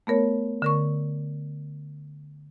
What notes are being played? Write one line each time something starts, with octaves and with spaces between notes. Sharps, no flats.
A3 B3 A#4 C#5
D3 A#4 C#6